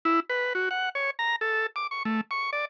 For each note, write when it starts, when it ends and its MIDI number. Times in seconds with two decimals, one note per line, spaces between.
0.05 0.20 64
0.30 0.53 71
0.55 0.69 66
0.71 0.89 78
0.95 1.10 73
1.19 1.36 82
1.41 1.67 69
1.76 1.87 86
1.91 2.03 85
2.05 2.21 57
2.31 2.50 85
2.53 2.65 74